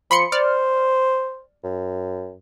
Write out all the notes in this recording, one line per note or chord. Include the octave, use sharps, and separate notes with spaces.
F3 B5 C6 C#7
C5 D5 F6
F#2